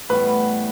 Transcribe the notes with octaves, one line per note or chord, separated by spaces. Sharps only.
A2 E3 G3 B3 B4